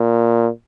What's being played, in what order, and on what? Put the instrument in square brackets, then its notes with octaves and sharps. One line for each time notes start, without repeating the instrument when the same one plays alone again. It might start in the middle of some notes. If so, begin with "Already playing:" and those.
Already playing: [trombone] A#2